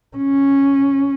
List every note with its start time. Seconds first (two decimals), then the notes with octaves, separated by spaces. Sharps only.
0.17 C#4